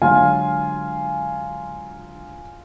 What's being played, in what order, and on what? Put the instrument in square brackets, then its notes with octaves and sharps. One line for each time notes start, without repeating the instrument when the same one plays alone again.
[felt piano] D3 F#3 G#3 [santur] F4 [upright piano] G#5